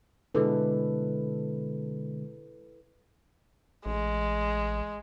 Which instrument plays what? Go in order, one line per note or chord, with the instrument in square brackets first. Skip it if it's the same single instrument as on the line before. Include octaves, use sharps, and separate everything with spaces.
[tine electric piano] B2 D3 G#3 [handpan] E4 A4 B4
[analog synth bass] A1 [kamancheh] G#3